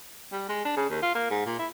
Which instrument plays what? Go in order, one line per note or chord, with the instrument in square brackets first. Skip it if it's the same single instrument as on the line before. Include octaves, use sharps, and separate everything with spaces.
[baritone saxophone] G3
G#3
D4
C#3
D#2
F4
A#3
G#2
A#2
E4